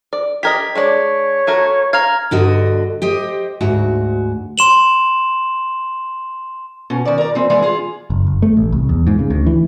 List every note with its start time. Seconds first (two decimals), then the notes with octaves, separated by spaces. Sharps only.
0.13 D5
0.43 G4 A#4 D#5 G#6 B6
0.75 G#3 D4 C#5 D5
1.47 A3 F#4 A#4
1.93 F5 A#5 F6 G#6
2.31 G2 D3 F#4 D#5
3.02 G4 C5 D#5
3.61 D2 G#2 F#4
4.58 C6 E7 F#7
6.90 B2 C#4
7.05 D#3 D5
7.18 A#4 D5
7.35 E3 C4
7.50 E3 G#3 G#4 D5
7.62 F4 G#4
8.10 F#1
8.27 F#1
8.42 A3
8.57 A1
8.72 C2
8.89 E2
9.07 G#2
9.19 C#3
9.30 D2
9.46 E3